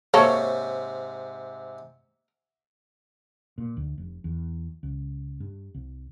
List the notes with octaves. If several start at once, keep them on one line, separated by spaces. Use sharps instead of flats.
G#2 C3 A#3 A4 C#5
A#2
D2
F1
E2
C#2
G2
C2